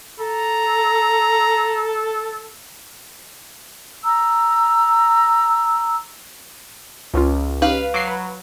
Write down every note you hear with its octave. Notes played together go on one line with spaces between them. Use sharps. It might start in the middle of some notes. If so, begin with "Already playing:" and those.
A4 A#5
A#5 E6
C#2 F3 C#4 F4
C#4 D#4 G4 B4 F5
F#3 D6 C7
B4